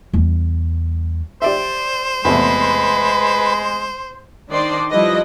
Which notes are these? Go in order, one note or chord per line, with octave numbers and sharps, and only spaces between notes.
E2 G3
G4 C5 D5 E5
E2 C3 G#3 A3 B4
D#3 D4 C5 D5 D#5 C6
F3 G3 E4 B4 D#5